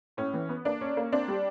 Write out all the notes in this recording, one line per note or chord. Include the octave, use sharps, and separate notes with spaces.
A2 C#4
E3
B3
A#3 D4
C#4
A#3
C4 D4
G3